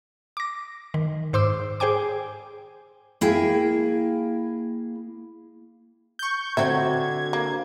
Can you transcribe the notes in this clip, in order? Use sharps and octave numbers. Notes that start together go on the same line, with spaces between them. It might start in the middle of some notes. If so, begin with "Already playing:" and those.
D6 A#6
D#3
G#2 C5 C6 D6 E6
G#4 C5 G5 G#5 D6
A#3 E4 G#4 G5
C#6 G6
D3 F#3 C4 F#4 E5 G#6
A#3